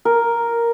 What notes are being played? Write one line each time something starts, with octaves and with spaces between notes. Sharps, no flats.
A#4